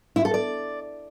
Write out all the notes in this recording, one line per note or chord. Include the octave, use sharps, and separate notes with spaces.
E4
A4
D5